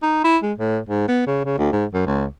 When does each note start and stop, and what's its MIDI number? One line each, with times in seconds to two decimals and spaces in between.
0.02 0.21 63
0.24 0.38 64
0.43 0.53 56
0.58 0.79 45
0.89 1.08 44
1.08 1.23 59
1.27 1.41 49
1.45 1.55 49
1.58 1.72 38
1.72 1.85 44
1.94 2.02 42
2.06 2.25 37